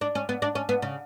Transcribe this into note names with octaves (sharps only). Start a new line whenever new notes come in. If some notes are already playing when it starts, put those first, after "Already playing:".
D4
C#4
B3
D4
C#4
B3
C#3